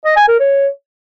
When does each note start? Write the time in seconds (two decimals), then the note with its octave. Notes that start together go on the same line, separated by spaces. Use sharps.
0.05 D#5
0.16 G#5
0.28 A#4
0.39 C#5